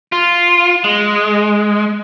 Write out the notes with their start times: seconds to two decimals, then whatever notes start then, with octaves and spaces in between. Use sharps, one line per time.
0.12 F4
0.84 G#3